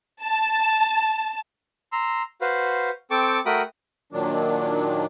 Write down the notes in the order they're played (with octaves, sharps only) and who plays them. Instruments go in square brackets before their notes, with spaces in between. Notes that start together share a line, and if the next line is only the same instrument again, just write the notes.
[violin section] A5
[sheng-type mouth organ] A#5 C6 E6
F#4 B4 C5 F5
C4 A4 G5 A5 C#6 D6
A3 F#4 A#4 G5 B5 D#6
[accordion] A#2 D#3 F#3 D4